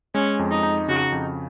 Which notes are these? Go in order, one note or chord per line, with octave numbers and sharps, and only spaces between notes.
G#3 C#4
F2
D#4
D#4
C#3 F#4
F2